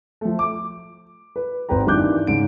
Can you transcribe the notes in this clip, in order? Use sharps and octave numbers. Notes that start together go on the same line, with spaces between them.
F3 A3
D6
B4
G#1 C4 B4 G5 A#5
G2 D#3 E3 D6 F#6 G6
G#2 C#3 D7